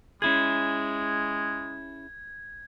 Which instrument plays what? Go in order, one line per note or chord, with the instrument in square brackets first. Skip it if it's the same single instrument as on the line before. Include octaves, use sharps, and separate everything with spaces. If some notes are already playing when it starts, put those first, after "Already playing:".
[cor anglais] G#3 [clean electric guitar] C#4 E4 G#4 [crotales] G#6